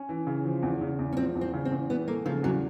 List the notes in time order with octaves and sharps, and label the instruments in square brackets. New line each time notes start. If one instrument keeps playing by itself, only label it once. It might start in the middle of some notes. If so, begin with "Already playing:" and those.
Already playing: [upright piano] C#4
E3
C#3
F3
E2
C#3
E2
[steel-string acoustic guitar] C#4
[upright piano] F3 [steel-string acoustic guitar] C4
[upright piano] E2
[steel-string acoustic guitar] C4
[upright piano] C#3
[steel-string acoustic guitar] C4
[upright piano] E2
[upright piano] E3 [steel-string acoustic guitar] B3
[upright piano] A3 [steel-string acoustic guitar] A#3
[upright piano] C#3 [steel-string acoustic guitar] F3
[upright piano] E2 [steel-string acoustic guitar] F#3